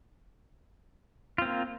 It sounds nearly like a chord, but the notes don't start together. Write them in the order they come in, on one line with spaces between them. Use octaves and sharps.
F4 C4 A#3